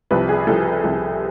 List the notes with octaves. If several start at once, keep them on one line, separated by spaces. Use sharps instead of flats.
C2 C3 F3 B4
G#4
C2 C3 F3 A4
C2 C3 F3